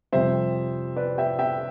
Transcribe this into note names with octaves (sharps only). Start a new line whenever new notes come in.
F2 C3 G3 C5 E5
B4 D5
E5 G5
E5 G5